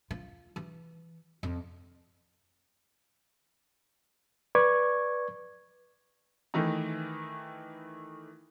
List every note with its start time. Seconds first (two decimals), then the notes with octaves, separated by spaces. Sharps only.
0.11 F4
0.56 E3
1.43 F2
4.55 B4 D5 C#6 D6 G#6
6.54 D#3 E3 A3 D#4